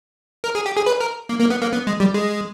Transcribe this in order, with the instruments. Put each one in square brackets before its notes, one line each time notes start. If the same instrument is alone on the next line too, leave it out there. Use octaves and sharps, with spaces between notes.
[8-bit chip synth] A#4
G#4
G4
G#4
B4
A#4
A#3
A#3
B3
A#3
B3
G#3
G3
G#3